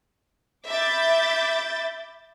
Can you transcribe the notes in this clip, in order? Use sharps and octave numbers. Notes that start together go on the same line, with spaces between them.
E5 B5 D6 G6 A6